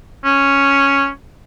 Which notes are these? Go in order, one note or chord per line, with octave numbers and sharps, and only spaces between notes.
C#4